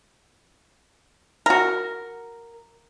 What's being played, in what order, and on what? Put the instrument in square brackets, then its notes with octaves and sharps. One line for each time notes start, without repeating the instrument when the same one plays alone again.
[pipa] F#4 A#4